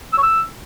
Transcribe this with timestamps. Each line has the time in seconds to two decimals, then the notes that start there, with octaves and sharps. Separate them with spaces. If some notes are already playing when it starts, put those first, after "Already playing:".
0.13 E6
0.18 C#5
0.23 E6